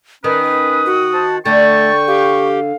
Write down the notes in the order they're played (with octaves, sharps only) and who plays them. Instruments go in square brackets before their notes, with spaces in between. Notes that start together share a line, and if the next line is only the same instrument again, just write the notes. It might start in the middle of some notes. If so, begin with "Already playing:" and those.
[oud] D#3 [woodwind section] C#4 B4 [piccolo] D#6
[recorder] F#4
[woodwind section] C5 A5
[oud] D3 [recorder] A3 [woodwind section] G5 C#6 [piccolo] A6
[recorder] G4 [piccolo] F5